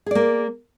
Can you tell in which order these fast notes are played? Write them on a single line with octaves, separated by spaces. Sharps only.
G#4 D5 A#3